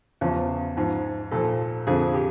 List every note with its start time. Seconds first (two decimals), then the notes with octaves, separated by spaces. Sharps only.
0.21 E2 C#3 F3
0.77 G#2 F3
1.31 A#2 F3 A4
1.87 F2 D3 F3 G#4
2.14 G4